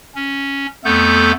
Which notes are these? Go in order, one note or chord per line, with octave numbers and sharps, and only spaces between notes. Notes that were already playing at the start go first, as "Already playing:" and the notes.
C#4
F2 A3 B3 A4 G6